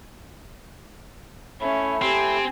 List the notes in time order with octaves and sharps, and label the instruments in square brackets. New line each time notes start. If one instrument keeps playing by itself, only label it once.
[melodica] A3 E4 [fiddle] C#4 [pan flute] E5
[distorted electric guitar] C4 [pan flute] G4 [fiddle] G#5